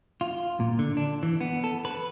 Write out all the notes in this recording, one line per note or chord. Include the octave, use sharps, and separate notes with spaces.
F4
A#2
D3
D4
E3
B3
A4
B4